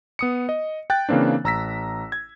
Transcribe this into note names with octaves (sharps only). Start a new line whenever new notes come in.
B3 D#6 C#7
D#5
G5 F#6 A6
C#3 E3 A#3 C4 D4
A1 A#5 E6 A#6 B6
G#6